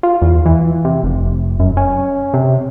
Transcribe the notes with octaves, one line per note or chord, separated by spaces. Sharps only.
F4
E2
E3
C3
F1
F#2
C#4
C3